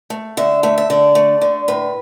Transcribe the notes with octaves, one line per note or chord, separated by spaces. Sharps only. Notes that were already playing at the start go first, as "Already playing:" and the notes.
A3
D3 E5
A3 E5
E5
D3 D5
A3
D3
A2 B4